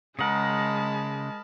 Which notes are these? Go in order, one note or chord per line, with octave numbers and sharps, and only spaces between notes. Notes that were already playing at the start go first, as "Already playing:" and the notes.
C#3 G#3 A#4 D#5 F#5 A5 B5